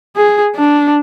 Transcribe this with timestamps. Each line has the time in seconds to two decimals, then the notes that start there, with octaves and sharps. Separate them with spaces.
0.17 G#4
0.56 D4